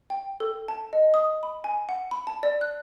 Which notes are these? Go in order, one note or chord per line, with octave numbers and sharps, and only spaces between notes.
G5
A4
A5
D#5
D#6
B5
G#5
F#5
B5
A5
D5
F#6